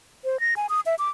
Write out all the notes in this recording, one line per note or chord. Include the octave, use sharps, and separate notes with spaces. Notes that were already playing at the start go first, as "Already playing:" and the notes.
C5
A#6
G#5
D#6
E5
D6